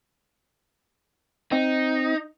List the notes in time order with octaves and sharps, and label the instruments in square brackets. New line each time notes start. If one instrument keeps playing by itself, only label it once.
[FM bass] C4 [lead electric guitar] D#4